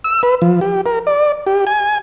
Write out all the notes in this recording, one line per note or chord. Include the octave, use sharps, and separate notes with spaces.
E6
B4
F3
G4
A#4
D5
G4
G#5